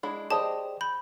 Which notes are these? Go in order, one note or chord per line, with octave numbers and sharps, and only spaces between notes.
G#3 D4 E4
G4 G#4 C5 D5 D#5 A5
B5 G6